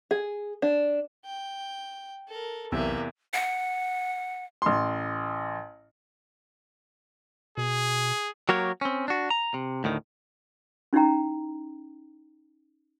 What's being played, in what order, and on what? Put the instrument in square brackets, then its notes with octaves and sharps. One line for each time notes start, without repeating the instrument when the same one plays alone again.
[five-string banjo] G#4
D4
[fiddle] G5
A4 A#4
[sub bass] B1 [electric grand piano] E2 C3 E6 [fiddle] A#3 E5
[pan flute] F#5
[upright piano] A1 C6
[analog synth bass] B2 [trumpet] G#4
[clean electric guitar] F#3 A#3 F#4 G4 A#4 C#5
C4 C#4
D4 F#4
A#5
C3
D2 A2 D#3
[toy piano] C#4 D#4 E4 G5 A#5